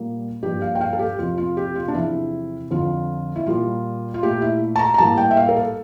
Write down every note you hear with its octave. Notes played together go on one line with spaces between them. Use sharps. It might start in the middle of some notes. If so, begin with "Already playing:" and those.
Already playing: A#2 G3 A#3
G2 F3 A#3 G4
F5
G5
F5
A4
G4
F2 C3 F3 F4
F4
G4
F4
D4
E2 C3 F3 E4
F2 D3 F3 F4
E4
A#2 G3 A#3 F4
F4
A#2 A3 G4
E4
A5
A#5
A#5
A2 G3 A#3 A5
G5
E5
F5
A#4
A4